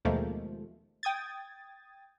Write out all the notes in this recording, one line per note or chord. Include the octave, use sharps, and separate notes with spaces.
D#2 B2 D#3 F3 G#3 A3
G5 D#6 G#6 A6